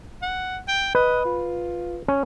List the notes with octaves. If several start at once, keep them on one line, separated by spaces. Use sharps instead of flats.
F#5
G5
B4 D#5
F4
C#4